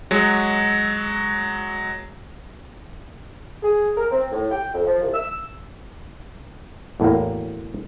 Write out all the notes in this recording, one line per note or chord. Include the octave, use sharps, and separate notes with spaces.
F#3 G#3 F#4
G#4
A#4
C4
A2
G5
F2
F3
C2
E6
E2 A2 F#3 A#3